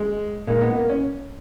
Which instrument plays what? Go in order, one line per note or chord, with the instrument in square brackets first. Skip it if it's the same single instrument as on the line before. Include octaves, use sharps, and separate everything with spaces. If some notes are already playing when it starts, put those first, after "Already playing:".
Already playing: [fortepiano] G#3
[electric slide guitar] A#2 G#3 D#4 [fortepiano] A#3
[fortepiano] B3
A#3
C#4